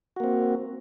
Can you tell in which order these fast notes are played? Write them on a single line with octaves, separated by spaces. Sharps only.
F#4 A#3 C4